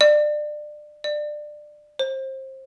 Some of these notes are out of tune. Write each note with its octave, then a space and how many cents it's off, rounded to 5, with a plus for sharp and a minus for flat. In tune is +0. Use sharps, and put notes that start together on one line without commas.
D5 +25
D5 +20
C5 +25